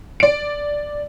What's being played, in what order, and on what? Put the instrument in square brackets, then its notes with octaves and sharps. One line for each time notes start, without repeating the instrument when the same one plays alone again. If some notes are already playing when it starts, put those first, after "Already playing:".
[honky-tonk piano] D5 D7